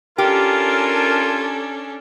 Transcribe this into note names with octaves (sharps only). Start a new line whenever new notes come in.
C#4 D4 F4 G4 A4 A#4